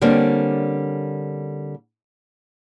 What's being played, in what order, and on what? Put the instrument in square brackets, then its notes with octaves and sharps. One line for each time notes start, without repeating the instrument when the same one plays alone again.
[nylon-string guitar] D3 G3 A#3 C4 C#4